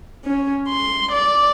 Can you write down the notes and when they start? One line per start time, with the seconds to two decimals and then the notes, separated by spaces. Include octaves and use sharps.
0.25 C#4
0.68 C6
1.12 D5